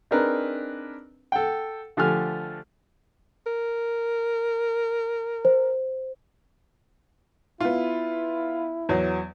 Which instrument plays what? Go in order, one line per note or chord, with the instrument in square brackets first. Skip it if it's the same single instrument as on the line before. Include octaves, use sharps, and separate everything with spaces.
[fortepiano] C4 D4 D#4 G#4 A#4 B4
A4 F#5 G5
D3 F3 A3 G4 G#5 F6
[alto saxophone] A#4
[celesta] C5
[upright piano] B3 F4 [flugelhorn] E4
[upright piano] E2 F#3